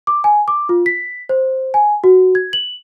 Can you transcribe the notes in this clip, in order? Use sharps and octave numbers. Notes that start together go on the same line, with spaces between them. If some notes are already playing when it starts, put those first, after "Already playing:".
D6
G#5
D6
F4
B6
C5
G#5
F#4
G#6
F#7